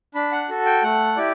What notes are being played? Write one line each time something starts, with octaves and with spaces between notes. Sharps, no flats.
D4 B5
F#5
F#4 A4
G5
A3 F#5
E4 G4 D5